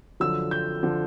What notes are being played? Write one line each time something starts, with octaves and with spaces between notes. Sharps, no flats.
F#2 D3 F3 E6
G6
D3 F3